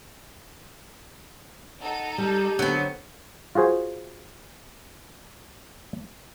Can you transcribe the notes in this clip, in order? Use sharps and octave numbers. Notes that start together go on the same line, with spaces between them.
D#4 A4 F#5
G3 G4
D3 F#3 B3 C4
F4 F#4 G#4 C5 G#5